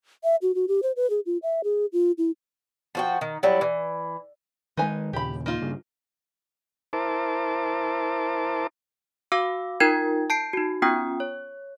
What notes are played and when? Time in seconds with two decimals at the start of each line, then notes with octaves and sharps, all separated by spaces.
0.24 E5
0.42 F#4
0.55 F#4
0.68 G4
0.83 C5
0.96 B4
1.10 G#4
1.26 F4
1.43 E5
1.64 G#4
1.93 F4
2.18 E4
2.95 F3 F#4 G5
3.21 D#3
3.43 F#3 G3 E4
3.61 E3
4.77 D#3 G#3 D#4 B4 G#5
5.13 D#2 A#2 C#3 G4 B5
5.46 A#3 D#4 F4
5.62 G2 C#3
6.93 E4 A#4 C5 A5 D6
9.32 F#4 F5 D6 E6
9.80 D#4 F4 A#4 G5 G#6
10.30 A5 G6 C7 D7
10.53 D#4 F#4
10.82 B3 C#4 F4 G5 D#6
11.20 C#5